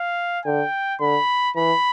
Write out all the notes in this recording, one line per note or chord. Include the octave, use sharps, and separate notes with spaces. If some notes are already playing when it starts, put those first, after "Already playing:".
Already playing: F5
D3 G5
D3 B5
E3 B5